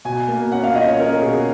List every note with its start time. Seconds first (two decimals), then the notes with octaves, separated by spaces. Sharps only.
0.05 B2 G#5
0.28 A#3
0.52 C#4 F#5
0.64 F5
0.75 F4 D#5
0.88 C#5
0.99 C#4 A#4
1.22 B2 G#4